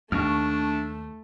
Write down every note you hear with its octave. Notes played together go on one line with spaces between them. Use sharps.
D#2 A3 D4 C#6 F6